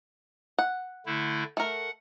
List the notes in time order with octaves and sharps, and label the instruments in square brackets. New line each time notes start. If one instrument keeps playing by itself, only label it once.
[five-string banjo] F#5
[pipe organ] D3 A3 E4
[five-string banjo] A3 A#4 [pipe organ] F#5